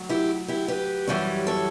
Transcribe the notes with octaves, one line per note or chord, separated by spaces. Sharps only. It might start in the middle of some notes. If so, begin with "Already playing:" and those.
Already playing: D2 F#3
E4 G4
E4 G4
G4 B4
F#2 E3 G3 C#4
A4 C#5